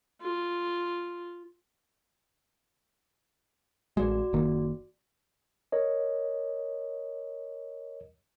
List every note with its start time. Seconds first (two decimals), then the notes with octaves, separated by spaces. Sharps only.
0.21 F4
3.97 A1 G#3 F#4 D5
4.33 F#1 D#3 A#3
5.72 A#4 C#5 D#5